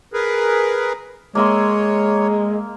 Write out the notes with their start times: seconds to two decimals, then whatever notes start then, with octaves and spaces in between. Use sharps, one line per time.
0.13 G#4 A#4 B4
1.35 G#3 A#3 C#5 E5 C6